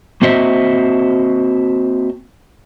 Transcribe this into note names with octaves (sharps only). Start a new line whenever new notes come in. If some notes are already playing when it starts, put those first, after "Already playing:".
A#3 C4 F#4 C5 D#5 E5